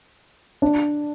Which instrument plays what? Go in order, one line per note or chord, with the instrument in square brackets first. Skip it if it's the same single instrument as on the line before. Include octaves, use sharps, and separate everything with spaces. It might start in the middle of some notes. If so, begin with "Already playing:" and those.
[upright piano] D4